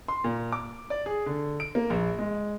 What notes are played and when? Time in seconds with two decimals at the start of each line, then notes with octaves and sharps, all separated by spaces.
0.08 C6
0.24 A#2
0.52 D6
0.90 D5
1.06 G#4
1.26 D3
1.60 D7
1.75 A#3
1.90 A#1
2.18 G#3